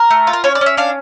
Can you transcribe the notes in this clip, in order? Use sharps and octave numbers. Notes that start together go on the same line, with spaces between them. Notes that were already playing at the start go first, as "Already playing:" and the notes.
Already playing: A#4
A3
F4
A#4
C#4 C#5
D5
C#4
E5
D4 F5